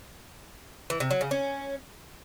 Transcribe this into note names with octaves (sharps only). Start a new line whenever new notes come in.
E3
C3
F#3
C#3
C#4